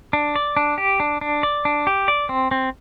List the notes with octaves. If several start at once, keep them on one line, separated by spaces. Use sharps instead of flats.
D4
D5
D4
G4
D4
D4
D5
D4
G4
D5
C4
C4